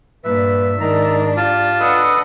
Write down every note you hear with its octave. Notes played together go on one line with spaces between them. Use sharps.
G2 A#2 B4 E5
G#2 D#3 D4 A#5
F4 G4 A5
D4 A4 B4 D#5 F#5